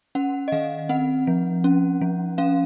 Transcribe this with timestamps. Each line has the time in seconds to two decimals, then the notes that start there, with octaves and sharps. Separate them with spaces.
0.15 C#4 F#5
0.48 D#5
0.52 D#3 F5
0.89 C4 F#5
1.27 F3
1.64 C#4
2.01 F3
2.38 C#4 F5